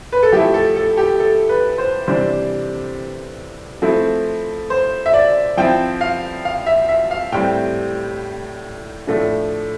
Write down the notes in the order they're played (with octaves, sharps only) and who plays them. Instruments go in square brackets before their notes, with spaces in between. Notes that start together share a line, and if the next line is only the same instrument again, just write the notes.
[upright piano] B4
A4
F3 A3 E4 G4
A4
A4
G4
A4
B4
C5
C3 E3 G3 D4 C5
F3 A3 C4 E4
C5
E5
D5
F3 C4 E4 G5
F5
F5
E5
E5
F5
A2 G3 C4 G5
A2 F3 A3 D4